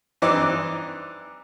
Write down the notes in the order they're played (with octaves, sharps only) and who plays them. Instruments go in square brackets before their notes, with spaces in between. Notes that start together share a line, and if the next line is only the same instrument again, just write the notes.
[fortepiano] G2 E3 C4 D#4 D6